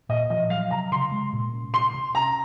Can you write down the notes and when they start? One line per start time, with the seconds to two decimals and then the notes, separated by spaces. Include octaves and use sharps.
0.09 A#2 D#5
0.30 F3 D#5
0.50 F#3 F5
0.71 C3 A#5
0.91 C#3 C6
1.11 G#3
1.33 A#2
1.53 C#4
1.73 C3 C6
1.94 C3
2.15 C#4 A#5